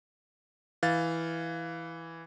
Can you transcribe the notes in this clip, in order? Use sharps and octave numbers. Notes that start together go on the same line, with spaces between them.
E3 F5 A6